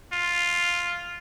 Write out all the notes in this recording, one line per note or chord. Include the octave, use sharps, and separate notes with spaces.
F4